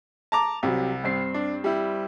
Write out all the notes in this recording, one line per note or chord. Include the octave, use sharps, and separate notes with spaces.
A5 A#5 D6
C2 C3 F#3
G2 C4 C7
D4
G3 E4